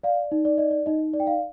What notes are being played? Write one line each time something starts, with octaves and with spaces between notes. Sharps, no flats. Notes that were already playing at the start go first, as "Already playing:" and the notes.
D5 F5
D#4
D5
D5 D#5
D5
D#4 D#5
D5
G5
F5